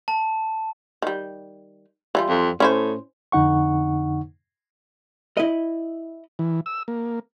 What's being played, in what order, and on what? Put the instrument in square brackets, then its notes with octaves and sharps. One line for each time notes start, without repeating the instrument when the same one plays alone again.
[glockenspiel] A5
[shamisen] D#3 G3
E3 G3 F4
[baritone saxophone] F2
[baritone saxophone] A2 [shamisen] C#4 E4 C5
[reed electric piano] F2 D3 D#4 F#5 C#6
[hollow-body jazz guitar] E4 D#5
[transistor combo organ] E3
E6
A#3